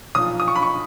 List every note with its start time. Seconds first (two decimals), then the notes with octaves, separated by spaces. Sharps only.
0.15 B1 A#2 F3 D#6
0.40 D#6
0.48 C#6
0.56 B5
0.62 C#6